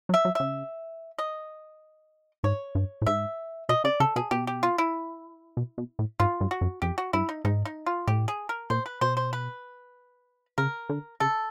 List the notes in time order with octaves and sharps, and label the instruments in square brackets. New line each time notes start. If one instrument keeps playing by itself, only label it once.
[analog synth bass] F#3
[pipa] E5
[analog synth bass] F#3
[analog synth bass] C#3 [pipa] E5
[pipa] D#5
[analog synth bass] G#2 [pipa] C#5
[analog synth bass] G2
A2
[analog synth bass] G#2 [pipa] E5
[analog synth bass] B2 [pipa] D#5
[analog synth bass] C#3 [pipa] D5
[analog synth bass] C#3 [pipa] A4
[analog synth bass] B2 [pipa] G#4
[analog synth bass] B2 [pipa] G4
[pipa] G4
F4
E4
[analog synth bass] B2
B2
A2
[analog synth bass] G#2 [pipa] F4
[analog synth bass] G2
[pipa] F#4
[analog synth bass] F#2
[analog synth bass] F2 [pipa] G4
[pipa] F#4
[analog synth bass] G2 [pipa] E4
[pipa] D#4
[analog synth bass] G#2 [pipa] D#4
[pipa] D#4
F4
[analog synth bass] A2 [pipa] G4
[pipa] G#4
A#4
[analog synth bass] A#2 [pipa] C5
[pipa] B4
[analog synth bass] B2 [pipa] C5
[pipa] C5
B4
[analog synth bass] C#3 [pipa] A#4
[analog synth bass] D3
[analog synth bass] C#3 [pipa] A4